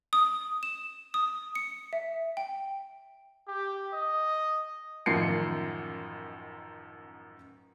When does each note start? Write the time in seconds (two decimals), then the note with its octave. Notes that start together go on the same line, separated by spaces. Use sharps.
0.13 D#6
0.63 E7
1.14 D#6
1.55 C#7
1.93 E5
2.37 G5
3.48 G4
3.93 D#5
5.06 A1 F#2 D#3 F3 C7 C#7